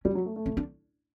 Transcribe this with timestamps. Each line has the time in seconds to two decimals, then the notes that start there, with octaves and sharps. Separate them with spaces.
0.05 G3 C#4
0.15 F#3
0.25 A3
0.36 A3
0.46 C#4
0.57 D4